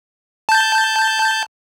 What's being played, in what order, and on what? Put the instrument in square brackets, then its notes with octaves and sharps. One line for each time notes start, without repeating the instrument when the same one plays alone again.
[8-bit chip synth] A5 G6